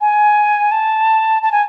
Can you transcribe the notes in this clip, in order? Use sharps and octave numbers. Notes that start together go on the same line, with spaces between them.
G#5
A5
A5
G#5